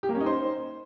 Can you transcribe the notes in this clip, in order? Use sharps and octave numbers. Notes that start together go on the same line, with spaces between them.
G4
A#3
C#4
D#4
C5